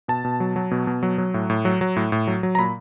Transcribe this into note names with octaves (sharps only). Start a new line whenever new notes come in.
B2 A5
B2
F#3
F#3
B2
B2
F#3
F#3
A2
A2
F#3
F#3
A2
A2
F#3
F#3
A#5
A#2 B5